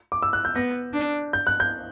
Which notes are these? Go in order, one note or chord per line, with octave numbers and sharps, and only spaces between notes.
D6
E6
F#6
G6
B3 A#6
D4
G6
F#6
G6